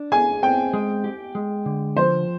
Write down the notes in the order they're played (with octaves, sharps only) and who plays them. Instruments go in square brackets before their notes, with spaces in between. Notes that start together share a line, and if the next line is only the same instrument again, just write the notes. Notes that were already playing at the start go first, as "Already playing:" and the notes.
Already playing: [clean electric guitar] D4
[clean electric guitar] G#4 [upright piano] G#5
[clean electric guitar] C4 [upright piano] G5
[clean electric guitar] G#3
G4
G#3
D3
[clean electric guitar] F3 [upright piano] C5